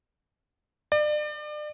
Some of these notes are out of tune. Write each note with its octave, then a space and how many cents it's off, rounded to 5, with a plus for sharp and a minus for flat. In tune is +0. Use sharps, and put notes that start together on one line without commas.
D5 +35